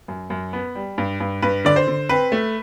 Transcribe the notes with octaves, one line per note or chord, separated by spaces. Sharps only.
F#2
F#2
B3
G3
G2
G2
G2 B4
D3 D5
C5
D3
C4 B4
A3